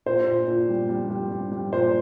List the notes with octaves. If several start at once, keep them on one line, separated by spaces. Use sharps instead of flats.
A#2 C5
A#2
A#2
G3
G3
G3
G3
G3
A#2 C5